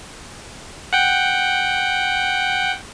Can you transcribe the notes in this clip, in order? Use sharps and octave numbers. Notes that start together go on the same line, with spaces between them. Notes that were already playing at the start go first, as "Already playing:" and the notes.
F#5 G5